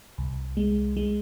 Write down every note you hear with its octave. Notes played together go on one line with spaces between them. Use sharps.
C2
G#3
G#3